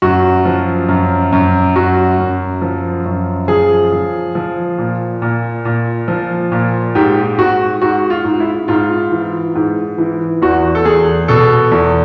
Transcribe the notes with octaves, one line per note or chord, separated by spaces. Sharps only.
F#2 F#4
F3
F#2
F#2
F#2 F#4
F#2
F3
F#2
F3 G#4
F3
F3
A#2
A#2
A#2
F3
A#2
G#2 G4
G#2 F#4
G#2 F#4
F4
G#2
E4
G#2 F4
E3
G#2
E3
E2 F#4
A4
E2 G#4
B2 A4
E2